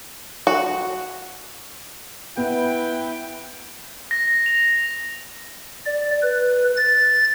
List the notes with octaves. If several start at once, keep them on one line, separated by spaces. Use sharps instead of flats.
F#4
B3 E4 B4 G5
A#6
F7
D5
B4
A6